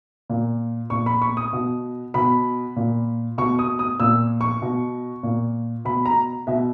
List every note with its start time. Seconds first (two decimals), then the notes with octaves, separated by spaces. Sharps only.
0.29 A#2
0.90 A#2 C#6
1.06 B5
1.22 C#6
1.37 D#6
1.53 B2
2.14 B2 B5
2.76 A#2
3.38 B2 C#6
3.59 D#6
3.79 D#6
4.00 A#2 E6
4.41 C#6
4.62 B2
5.23 A#2
5.85 B2 B5
6.06 A#5
6.47 B2 E5